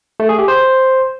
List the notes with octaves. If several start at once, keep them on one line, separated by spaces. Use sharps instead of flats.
A3
G#4
G4
C5